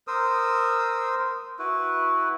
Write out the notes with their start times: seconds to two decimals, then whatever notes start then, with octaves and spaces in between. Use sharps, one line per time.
0.07 A#4 C5 D#6 E6
1.59 E4 F#4 B4